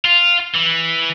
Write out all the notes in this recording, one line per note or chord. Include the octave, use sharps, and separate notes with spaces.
F4
E3